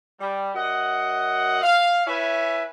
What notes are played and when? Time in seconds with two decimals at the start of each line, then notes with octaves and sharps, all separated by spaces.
0.20 G3
0.54 F#2 D#5 F#5
1.62 F5
2.07 E4 B4 C#5 E5 G#5